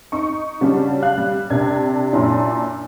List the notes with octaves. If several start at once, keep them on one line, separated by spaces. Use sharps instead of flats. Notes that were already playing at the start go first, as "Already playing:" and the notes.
D#4 C#6
C#3 F#3 G3 C#4 D4
F5 F#6
G3
C3 D4 A#4 G#6
F#2 A#2 D4 E4